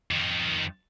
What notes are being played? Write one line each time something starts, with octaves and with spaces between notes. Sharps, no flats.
F2 D#3